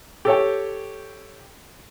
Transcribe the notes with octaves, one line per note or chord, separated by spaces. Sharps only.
G4 A4 C#5 G5